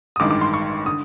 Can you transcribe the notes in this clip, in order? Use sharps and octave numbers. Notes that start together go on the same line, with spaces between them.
D#6
A1 G2 D#3 G#3 D6
D6
C6
C#6
D3 D#6